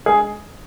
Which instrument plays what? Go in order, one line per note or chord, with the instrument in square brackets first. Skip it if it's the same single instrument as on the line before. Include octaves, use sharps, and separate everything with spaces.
[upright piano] G#3 G#4